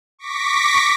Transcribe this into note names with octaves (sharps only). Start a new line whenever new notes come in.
C#6 D6 A#6 B6